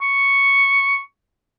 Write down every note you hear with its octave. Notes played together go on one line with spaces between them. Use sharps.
C#6